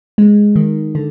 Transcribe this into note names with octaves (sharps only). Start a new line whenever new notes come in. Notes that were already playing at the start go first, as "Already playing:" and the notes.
G#3
D#3
D3